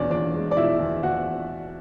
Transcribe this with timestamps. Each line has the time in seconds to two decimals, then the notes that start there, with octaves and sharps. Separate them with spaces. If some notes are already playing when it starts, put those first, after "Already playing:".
Already playing: E2 B2 C#4 D4 D5
0.10 E2 D4 D5
0.34 G#3
0.51 D5
0.57 B2 E4 E5
0.79 E2
1.02 E2 F#4 F#5